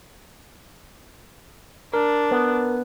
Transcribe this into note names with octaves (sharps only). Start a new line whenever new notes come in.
D4 A#4
B3